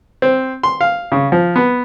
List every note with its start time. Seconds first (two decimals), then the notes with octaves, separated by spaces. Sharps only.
0.22 C4
0.63 C6
0.81 F5
1.12 C#3
1.32 F3
1.56 B3